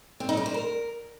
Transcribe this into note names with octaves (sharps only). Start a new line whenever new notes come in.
C4
D#4
G3
C5
A#4